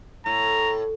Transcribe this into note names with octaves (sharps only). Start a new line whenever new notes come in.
A2 A#5